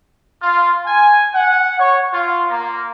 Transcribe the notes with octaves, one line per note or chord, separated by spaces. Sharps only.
F4
G#5
F#5
C#5
F4
A#3